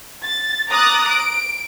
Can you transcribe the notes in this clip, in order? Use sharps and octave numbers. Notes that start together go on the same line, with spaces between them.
A6
A#5 D6 D#6 F#6 A6
D7